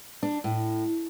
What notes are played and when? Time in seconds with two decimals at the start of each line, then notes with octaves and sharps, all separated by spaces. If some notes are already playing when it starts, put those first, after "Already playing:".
0.23 D4
0.44 A2